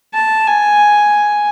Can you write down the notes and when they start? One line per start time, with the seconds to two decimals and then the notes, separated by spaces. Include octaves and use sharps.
0.14 A5
0.47 G#5